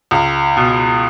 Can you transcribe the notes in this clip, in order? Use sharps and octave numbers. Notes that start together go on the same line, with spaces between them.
C#2
B2